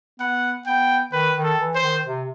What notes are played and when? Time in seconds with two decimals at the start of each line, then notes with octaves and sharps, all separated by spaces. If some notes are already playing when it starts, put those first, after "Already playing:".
0.20 B3 F#5
0.67 B3 G5
1.12 D#3 B4
1.35 D#3
1.44 A4
1.59 E3
1.75 C5
1.82 D#3
2.06 C3